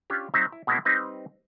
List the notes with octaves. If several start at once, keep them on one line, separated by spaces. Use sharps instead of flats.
C#4 D4 F4 G4
F#3 C4 D#4 E5
E4
B2 G#3 A#3 C4 E4
G3 C4 D#4 B4